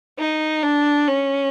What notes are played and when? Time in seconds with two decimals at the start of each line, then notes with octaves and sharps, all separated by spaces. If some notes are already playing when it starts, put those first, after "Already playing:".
0.19 D#4
0.63 D4
1.07 C#4